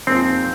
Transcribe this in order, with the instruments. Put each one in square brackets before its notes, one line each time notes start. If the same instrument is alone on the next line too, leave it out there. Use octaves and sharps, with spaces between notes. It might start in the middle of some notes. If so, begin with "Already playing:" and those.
[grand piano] F2 F3 A#3 D#4 G#4 [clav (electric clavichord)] C4